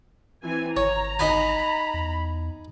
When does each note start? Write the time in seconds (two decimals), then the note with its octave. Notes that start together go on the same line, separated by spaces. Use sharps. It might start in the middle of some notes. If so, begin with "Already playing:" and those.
0.43 E3 C4 G#5
0.77 G#1 C#5 A#5
1.19 D#4 D#5 G#5 B5
1.94 E2